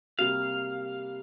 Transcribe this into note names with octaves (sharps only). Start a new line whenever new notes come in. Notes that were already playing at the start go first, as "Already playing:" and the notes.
C3 G3 A#3 F5